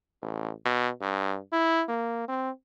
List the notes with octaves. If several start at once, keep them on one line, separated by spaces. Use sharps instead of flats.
A1
B2
G2
E4
A#3
C4